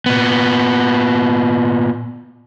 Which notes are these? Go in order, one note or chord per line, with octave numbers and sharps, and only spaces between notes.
A#2 B3